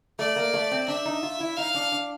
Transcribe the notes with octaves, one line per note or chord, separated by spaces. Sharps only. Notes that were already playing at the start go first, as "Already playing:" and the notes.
A3 D5
A#3
A3
C4
D4 E5
D#4
F4
E4
D#4 F5
D4
D4